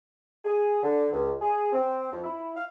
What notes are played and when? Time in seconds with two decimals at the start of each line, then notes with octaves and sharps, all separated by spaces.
0.45 G#4
0.83 D3
1.12 C#2
1.42 G#4
1.73 C4
2.11 F2
2.23 E4
2.56 F5